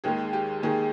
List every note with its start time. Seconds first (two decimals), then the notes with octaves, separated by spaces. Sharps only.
0.04 D#2 D#3 G#3 G#4
0.33 G4
0.63 D#2 D#3 G#3 G#4